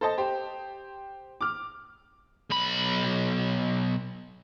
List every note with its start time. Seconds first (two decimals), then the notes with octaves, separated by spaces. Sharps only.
0.01 A4 C5 D#5 A5
0.18 G4 C5
1.41 D6 F6
2.51 B1 B5